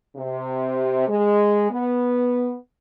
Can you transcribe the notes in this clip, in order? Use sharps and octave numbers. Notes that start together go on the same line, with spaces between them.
C3
G#3
B3